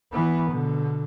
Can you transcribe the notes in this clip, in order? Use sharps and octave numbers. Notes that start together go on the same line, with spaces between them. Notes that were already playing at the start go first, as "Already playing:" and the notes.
E3 B3
B2 D3